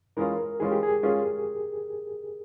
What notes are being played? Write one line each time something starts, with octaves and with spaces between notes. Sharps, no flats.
E3 G#3 C#4 F4 A#4
E3 G#3 C#4 F4 G#4
G4
G#4
G#3 C#4 F4